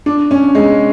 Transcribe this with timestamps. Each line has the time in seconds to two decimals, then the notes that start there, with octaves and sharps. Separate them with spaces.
0.06 D4
0.31 C#4
0.55 G#3